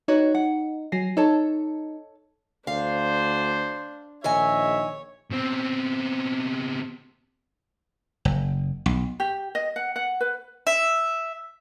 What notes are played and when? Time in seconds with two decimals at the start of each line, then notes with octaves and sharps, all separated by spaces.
0.08 D#4 F#4 B4 C#5
0.35 F#5
0.92 F#3 G#5 A#6 C7
1.17 D#4 A4 C#5 A5
2.67 D2 D4 C5 F5
4.24 A#1 D#3 C#5 D#5 E5 G#5
5.32 B2 C4
8.25 F#1
8.86 B1
9.20 G4
9.55 D#5
9.76 F#5
9.96 F#5
10.21 B4
10.67 E5